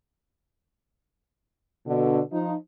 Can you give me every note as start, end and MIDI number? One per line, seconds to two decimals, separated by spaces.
1.86 2.20 47
1.86 2.20 50
2.32 2.53 53
2.32 2.53 63